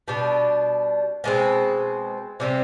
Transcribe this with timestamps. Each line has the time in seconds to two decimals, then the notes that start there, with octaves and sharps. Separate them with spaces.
0.08 B2 G3 D4
1.24 B2 G#3 C4
2.40 C3 G3 C4